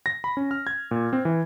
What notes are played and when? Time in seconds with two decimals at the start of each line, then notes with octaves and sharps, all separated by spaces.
0.06 A#6
0.24 B5
0.37 C#4
0.51 F6
0.67 G#6
0.91 A#2
1.13 C4
1.25 E3